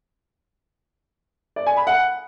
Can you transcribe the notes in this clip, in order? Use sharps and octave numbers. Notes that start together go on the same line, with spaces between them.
D5
G#5
B5
F#5